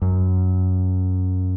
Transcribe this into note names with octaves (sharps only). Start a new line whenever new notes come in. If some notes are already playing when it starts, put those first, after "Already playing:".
F#2